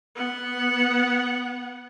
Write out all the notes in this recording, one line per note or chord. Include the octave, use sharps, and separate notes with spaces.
B3 F#5